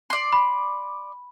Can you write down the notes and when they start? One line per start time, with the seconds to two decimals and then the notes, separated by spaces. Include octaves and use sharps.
0.10 D5 C6
0.32 B5